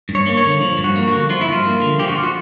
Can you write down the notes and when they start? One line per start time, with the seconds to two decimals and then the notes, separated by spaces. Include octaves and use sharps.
0.09 G2
0.15 C#5
0.26 A#3
0.37 C#5
0.44 D3
0.61 F3
0.78 G2
0.84 F#4
0.96 A#3
1.08 D3 F#4
1.30 F3 F4
1.41 E4
1.48 G2 F4
1.65 A#3
1.82 D3
1.99 F3 G4
2.08 F#4
2.15 F4
2.23 F#4